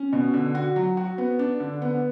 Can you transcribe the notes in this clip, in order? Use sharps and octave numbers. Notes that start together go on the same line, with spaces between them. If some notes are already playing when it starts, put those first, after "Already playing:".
Already playing: C#4
B2
D3
F#4
F#3
F#4
B3
D4
D3
B3